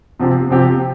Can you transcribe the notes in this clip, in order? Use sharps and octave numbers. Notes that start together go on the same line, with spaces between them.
C3 F3 C4 G4
C3 F3 C4 G4